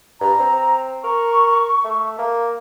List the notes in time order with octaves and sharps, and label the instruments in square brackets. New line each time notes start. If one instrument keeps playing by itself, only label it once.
[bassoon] G2 [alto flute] A#5
[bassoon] C4
[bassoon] A#4 [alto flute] C#6
[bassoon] A3
A#3